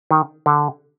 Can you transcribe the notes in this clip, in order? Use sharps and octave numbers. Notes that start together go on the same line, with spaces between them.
D#3
D3